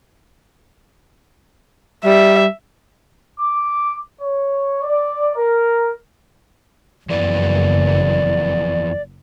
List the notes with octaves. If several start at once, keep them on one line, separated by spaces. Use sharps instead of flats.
G3 E5
D6
C#5
D5
A#4
F#1 F2 E3 B3 D5